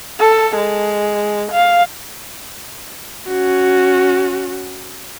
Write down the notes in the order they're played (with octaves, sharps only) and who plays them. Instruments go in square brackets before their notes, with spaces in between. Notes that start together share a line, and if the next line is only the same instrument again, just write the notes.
[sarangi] A4
G#3
F5
[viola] C#4 F#4